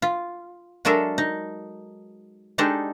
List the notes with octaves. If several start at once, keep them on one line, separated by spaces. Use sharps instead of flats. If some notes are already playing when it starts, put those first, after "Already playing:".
F4
F#3 G#3 D4 A4 A#4 E5
D#4
G#3 D4 D#4 G4 A4